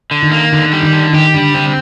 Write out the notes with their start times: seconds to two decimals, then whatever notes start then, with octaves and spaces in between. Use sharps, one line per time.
0.11 D3
0.22 D#3
0.31 A#3
0.52 D3 D#3
0.73 G3
0.83 D#3
0.93 D3
1.13 D#3 G4
1.34 D3 G3
1.55 D3 C4